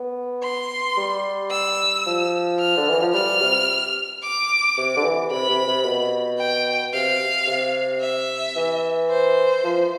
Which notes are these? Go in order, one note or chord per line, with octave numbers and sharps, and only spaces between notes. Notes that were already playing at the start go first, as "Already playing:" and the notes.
Already playing: B3
C6
G3
E6
F3
F6
D3
E3
F3
G3 F6
C3
D6
C3
D3
E3
C3 B5
C3
C3
B2
G5
C3 F5
C3
E5
E3
C5
F3